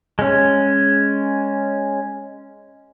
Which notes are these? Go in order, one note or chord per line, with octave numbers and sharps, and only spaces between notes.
G#3 C#4